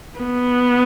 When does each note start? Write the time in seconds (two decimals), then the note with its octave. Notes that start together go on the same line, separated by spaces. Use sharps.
0.19 B3